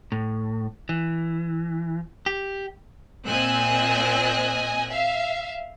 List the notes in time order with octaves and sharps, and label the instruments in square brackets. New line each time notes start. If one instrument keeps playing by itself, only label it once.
[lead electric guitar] A2
E3
G4
[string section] A#2 C4 D#5 G#5 E6 F#6
E5 F5